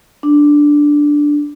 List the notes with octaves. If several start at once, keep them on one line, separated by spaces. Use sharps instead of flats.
D4